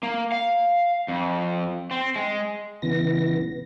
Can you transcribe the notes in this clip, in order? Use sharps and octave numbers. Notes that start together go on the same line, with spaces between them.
A#3
F5
F2
C4
G#3
C#3 E3 B3 A#6